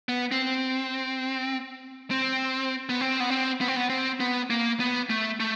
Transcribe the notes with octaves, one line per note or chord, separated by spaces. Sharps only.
B3
C4
C4
B3
C4
B3
C4
B3
C4
B3
C4
B3
A#3
B3
A3
A3